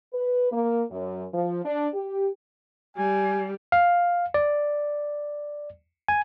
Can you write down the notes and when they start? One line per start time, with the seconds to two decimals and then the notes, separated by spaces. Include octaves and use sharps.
0.13 B4
0.52 A#3
0.91 F#2
1.33 F3
1.64 D4
1.93 G4
2.97 G3 G#5
3.72 F5
4.34 D5
6.08 G#5